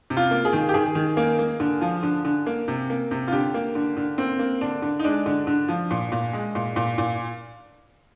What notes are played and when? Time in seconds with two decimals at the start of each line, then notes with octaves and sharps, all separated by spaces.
0.10 C3
0.17 F4
0.31 A#3
0.45 G#4
0.53 D#3
0.69 G4
0.74 D#3 G#4
0.95 D#3
1.17 A#3
1.39 A#3
1.60 D3
1.81 F3
2.03 D3
2.25 D3
2.46 A#3
2.68 C3
2.90 A#3
3.11 C3
3.27 F4
3.32 D3 G4
3.54 A#3
3.75 D3
3.97 D3
4.18 A#3 C4
4.39 A#3
4.61 D3 D4
4.82 D3
4.99 D#4
5.04 G#3 D4
5.26 D3
5.47 D3
5.68 F3
5.91 A#2
6.12 A#2
6.33 G#3
6.55 A#2
6.76 A#2
6.98 A#2